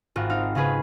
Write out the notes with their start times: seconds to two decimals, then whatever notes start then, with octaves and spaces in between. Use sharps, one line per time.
0.16 G#1 F4 F#4
0.29 C4 D#4 F5
0.55 C#3 C#4 F4 G#4 B4